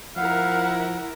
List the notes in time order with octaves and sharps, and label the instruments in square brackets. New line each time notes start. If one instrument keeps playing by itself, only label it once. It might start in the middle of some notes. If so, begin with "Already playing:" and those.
[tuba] F3 [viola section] E4 A#4 [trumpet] F5 [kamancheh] F#5